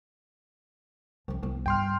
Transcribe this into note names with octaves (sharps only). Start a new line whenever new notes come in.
C2 F3 C#4
C2 B3 E4
G2 G5 C6 F6